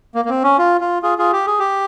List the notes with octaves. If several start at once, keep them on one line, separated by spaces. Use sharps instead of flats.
A#3
A#3
C4
C#4
F4
F4
F4 G#4
F4 G#4
G4
G#4
G4